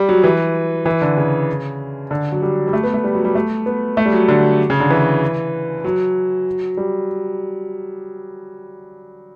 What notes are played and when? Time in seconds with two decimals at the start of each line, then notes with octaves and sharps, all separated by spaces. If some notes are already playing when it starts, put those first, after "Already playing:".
Already playing: G3
0.09 F#3
0.24 E3
0.86 E3
1.02 D3
1.17 C#3
2.11 D3
2.32 F#3
2.42 G3
2.68 G3
2.73 A3
2.83 B3
2.94 A3
3.04 G3
3.15 F#3
3.25 G3
3.35 A3
3.66 B3
3.97 A3
4.06 G3
4.13 F#3
4.28 D3
4.70 C#3
4.80 D3
4.90 E3
5.84 F#3
6.77 G3